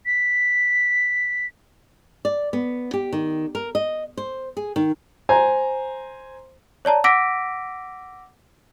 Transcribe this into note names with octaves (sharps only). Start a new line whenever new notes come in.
B6
D5
B3
G4
D#3
A#4
D#5
C5
G#4
D#3
C5 G#5 A#5
C#5 D5 A5 A#5
F#5 D6 E6 A#6 B6 D7